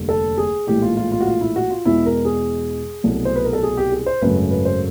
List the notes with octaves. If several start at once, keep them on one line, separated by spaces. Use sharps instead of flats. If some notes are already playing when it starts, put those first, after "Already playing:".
Already playing: F1 D#2 D3 G3 A#3
A4
G#4
A#1 A2 E3 G#3 G4
F4
F4
F4
F#4
F4
E4
F#4
F4
E2 B2 G#3 E4
A#4
G#4
C2 B2 F#3 A3
C5
B4
A#4
A4
G#4
G4
G#4
C5
G#1 F#2 C#3 F#3 A3 B4
B4
C5